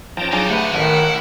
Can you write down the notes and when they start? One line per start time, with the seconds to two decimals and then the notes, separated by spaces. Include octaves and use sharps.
0.17 F3 C#4 G5 A5 A#5
0.33 F#3 D4 D#4 F4 G#4
0.50 D3 A3 G4 B4 D#5 F#5
0.74 A1 A2 D#3 E4 F#5